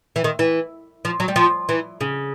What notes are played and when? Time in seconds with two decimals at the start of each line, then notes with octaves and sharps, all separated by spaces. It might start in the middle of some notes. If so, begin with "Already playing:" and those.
0.16 E3
0.24 D#3
0.39 E3
1.05 F3
1.20 F#3
1.28 G3
1.36 F3
1.69 E3
2.01 C#3